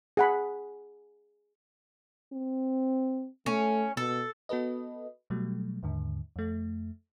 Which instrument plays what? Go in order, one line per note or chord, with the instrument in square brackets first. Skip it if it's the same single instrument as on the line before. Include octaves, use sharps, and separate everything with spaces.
[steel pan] G#4 F#5 B5
[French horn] C4
[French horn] A3 [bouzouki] C#4
[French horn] B2 [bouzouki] A4
[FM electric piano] B3 F#4 A4 B4 D#5
B2 F#3 G3 A3
D#2 G#2 D3
F2 A3